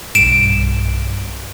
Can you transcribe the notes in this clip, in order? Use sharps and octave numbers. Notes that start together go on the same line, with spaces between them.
B1 G2 D7 E7